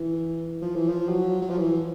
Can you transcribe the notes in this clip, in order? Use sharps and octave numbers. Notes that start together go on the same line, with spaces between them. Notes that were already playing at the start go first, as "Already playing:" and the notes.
Already playing: E3
F3
E3
F3
F#3
F#3
F3
E3